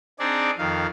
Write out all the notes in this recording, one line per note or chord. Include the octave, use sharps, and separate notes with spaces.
C4 D4 D#4 G#4 D5
F2 D#3 F5